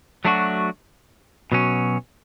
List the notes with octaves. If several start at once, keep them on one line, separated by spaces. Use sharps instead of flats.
F#3 A3 D4 F#4
B2 F#3 C#4